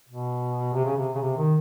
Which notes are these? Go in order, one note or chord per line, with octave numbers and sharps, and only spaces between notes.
B2
C3
C#3
C3
C#3
C3
D#3